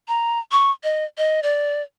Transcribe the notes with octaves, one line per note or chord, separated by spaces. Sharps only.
A#5
C#6
D#5
D#5
D5